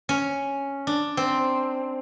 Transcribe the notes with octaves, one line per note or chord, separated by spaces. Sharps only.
C#4
D4
C4